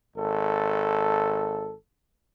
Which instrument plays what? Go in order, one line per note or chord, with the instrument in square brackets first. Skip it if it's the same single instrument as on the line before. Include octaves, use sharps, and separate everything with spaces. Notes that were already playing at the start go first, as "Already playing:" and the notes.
[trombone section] G#1 A4